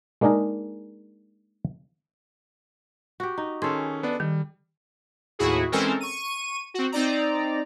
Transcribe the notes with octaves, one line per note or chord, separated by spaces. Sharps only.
G#3 A#3 D4 D#4 G#4 A#4
F#4 G4
D#4
D#3 C#4 G#4 A4 C6
B3 D4
D#3 G3
D#2 A2 E4 F#4 G#4
E3 G#3 C4 C#4 A4 A#4
C#6 D#7
C4 F#4
C4 D#4 D5 A#5